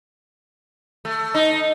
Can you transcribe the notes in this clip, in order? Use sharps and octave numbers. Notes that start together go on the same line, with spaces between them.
A3
D#4